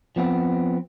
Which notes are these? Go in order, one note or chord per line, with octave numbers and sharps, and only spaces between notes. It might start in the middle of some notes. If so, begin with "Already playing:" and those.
F3 B3 C4